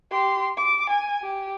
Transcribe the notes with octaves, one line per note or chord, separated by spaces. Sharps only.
G4 C6
D6
G#5
G4